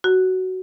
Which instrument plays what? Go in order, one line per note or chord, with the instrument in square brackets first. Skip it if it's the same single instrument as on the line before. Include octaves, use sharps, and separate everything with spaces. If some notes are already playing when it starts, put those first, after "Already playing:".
[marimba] F#4